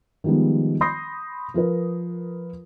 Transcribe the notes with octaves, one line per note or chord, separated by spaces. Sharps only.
D#3 F3 G3 G#3 B3
B5 C6 D#6 G6 A#6 C7
F3 F4 A#4 B4